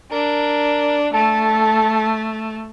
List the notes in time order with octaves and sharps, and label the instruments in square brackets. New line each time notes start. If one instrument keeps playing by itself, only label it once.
[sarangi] D4 [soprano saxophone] A#4
[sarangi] A3 [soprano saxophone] A4